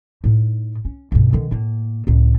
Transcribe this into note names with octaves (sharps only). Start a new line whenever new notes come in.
A2 D#4
C#4
B1 G2
D3 D#3
A2 A#3
C#2 A2